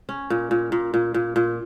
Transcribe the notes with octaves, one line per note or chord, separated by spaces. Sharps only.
C#4
A#2
A#2
A#2
A#2
A#2
A#2